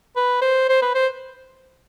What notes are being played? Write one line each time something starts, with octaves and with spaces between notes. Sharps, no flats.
B4
C5
C5
B4
C5